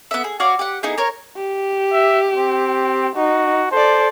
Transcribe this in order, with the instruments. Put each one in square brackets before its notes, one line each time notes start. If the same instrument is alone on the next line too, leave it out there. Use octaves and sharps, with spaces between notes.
[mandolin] B3 E5
G#4
F#4 C#5 D5 F5
G4 F#5
B3 D#4 E4 G#4
A#4 C#5
[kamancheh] G4
[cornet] E5
C4
[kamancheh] D#4 [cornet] F#4
[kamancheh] A4 D5 [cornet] C5